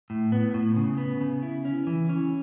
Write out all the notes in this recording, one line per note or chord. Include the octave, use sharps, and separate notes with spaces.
A2
B3
A2
C#3
B3
C#3
E4
C#4
E3
C#4